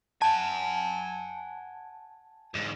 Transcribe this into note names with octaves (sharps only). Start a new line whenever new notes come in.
F#5 G#5 A5
E2 G#2